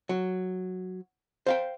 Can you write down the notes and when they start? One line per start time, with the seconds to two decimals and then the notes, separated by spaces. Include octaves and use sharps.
0.09 F#3
1.46 C5 F5 G5